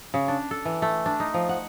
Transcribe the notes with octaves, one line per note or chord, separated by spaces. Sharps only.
C#3
D4
A4
E3
A3
D4
D#4
F3
F#5